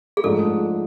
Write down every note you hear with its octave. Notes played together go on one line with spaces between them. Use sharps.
G#4
G#2 F3 A3 D4 A4